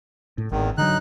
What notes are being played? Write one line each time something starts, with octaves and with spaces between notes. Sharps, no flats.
A2
G#1 E2 D#3
D3 D#3 F#3 D#4 F#6